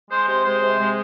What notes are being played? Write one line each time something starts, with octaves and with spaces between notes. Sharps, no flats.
G#3 C5
C3 C5
G#3 C5
C3
G#3